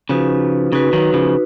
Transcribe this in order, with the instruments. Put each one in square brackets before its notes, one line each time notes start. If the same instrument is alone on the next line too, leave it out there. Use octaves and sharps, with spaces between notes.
[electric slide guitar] C#3 F3 [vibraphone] D#4 F#4 B4
[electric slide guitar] C#3 [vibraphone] D#4 F#4 B4
[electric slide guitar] D#3 F#3
C#3 F3